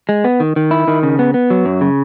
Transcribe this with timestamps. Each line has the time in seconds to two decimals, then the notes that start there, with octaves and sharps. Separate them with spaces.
0.09 G#3
0.24 B3
0.40 D#3
0.56 D#3
0.71 E4
0.88 D#3
1.03 C#3
1.19 B3
1.34 B3
1.50 F#3
1.65 F#2
1.81 C#3